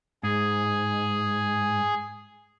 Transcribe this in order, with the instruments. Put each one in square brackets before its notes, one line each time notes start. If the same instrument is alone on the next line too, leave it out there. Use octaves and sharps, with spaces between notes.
[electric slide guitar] G#2 [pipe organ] G#4